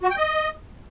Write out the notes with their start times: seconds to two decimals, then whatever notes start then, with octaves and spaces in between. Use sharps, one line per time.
0.03 F#4
0.10 G5
0.17 D#5